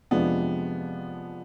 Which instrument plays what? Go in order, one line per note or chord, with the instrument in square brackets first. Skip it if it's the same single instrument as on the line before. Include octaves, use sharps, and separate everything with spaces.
[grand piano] F2 C3 F3 G#3 D4 [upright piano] B3